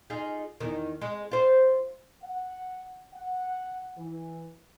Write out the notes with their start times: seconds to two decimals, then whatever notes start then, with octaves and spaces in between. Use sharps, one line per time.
0.10 D#4 F4 G#4
0.60 E2 D#3
1.01 G#3
1.31 F4 C5
2.23 F#5
3.14 F#5
3.98 E3